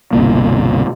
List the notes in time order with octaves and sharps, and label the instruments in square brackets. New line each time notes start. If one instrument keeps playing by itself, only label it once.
[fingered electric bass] G1 C2 B2 A#3